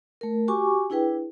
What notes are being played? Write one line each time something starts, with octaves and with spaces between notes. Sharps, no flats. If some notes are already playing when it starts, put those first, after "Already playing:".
A3 A#4
F#4 G4 G#5 C#6 D6
D4 E4 G#4 B4 G5